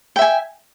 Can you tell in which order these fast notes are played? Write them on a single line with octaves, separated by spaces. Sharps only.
G5 E5 G#5